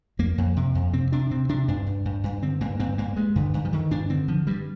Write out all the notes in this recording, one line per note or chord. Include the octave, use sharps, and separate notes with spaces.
F2 A#3
F2
C3
F2
C3 C4
C3 D4
C3 C4
C3 D4
G2 D4
G2
G2
G2
D3 C4
G2 A#3
G2 C4
G2 A#3
G2 G#3
G2 D3
G2 D#3
F3
D3 D#3
G2 D4
D3 C4
D3 F3
G2 G3